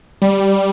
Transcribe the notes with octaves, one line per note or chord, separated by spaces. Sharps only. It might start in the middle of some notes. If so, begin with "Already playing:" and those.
G3